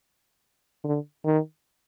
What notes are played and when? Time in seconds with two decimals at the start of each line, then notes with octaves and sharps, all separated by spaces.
0.84 D3
1.25 D#3